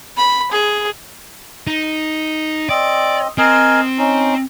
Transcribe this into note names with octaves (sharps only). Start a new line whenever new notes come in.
B5
G#4
D#4
C4 D5 D#5
C4 A#4 D#5 G#5
C#4 D#4